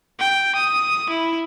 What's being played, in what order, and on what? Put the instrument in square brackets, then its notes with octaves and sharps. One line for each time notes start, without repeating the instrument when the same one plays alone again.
[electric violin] G5
D#6
E4